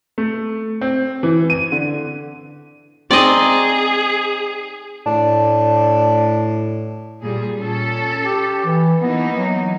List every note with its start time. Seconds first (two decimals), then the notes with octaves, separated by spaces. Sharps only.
0.18 A3
0.81 C4
1.23 E3
1.50 D#7
1.72 D3
3.11 C4 D#4 G#4 D5 D#5 G#5
5.06 A2 D4
7.21 A#2 G3 G#4
7.58 A#2 C#4 A4
8.25 G4
8.65 E3
9.00 E3 A#3 B3 D#4
9.36 F#3